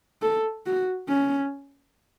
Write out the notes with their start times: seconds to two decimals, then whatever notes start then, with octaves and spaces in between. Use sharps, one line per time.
0.22 A4
0.66 F#4
1.09 C#4